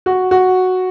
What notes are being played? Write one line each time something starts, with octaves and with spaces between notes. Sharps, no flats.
F#4
F#4